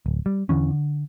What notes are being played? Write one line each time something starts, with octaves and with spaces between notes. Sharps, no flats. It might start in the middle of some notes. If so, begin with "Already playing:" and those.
D1
G3
E2 D3 E3 C#4
D3